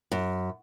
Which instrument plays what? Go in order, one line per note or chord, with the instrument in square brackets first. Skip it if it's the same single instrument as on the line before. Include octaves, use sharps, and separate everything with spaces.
[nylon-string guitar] F#2